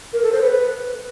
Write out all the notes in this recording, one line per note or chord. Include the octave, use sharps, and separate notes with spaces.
A#4
A4
C5
B4